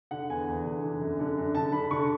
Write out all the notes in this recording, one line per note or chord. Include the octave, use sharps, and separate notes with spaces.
D3 F#5
E2 G#5
E2
D3
D3
F#2
D3
F#2
D3 A5
D3 B5
D3 C#6